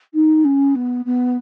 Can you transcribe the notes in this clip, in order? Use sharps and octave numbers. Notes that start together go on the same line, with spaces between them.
D#4
C#4
B3
B3